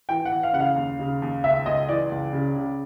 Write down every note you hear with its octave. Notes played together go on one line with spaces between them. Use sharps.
E3 G5
F#5
E3
F5
C#3 F#5
F5
D#2
C#3
D#2
C#2 E5
C#2 D#5
E3 D5
C#2
C#3
C#3